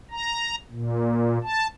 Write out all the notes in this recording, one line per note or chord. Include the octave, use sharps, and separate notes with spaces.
A#5
A#2
A5